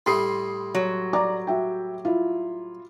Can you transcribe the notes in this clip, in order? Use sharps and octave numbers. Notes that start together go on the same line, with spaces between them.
A2 G3 A3 C6 D#6 C7
F#3
D5 A#5 D6
F#4 E5 G5
E4 F4